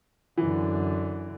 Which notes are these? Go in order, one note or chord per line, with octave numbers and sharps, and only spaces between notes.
F#2 D3 E3